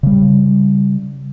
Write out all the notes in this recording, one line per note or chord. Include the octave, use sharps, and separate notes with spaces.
C#3 G3